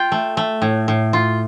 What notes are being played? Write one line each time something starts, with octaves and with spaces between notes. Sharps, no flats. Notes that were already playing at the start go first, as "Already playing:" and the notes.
Already playing: F4 G5
A3
A3
A2
A2
F4